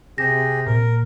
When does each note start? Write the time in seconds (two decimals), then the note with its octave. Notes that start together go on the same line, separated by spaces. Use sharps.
0.18 C3 G4 G#4 A#6
0.67 A#2 A#4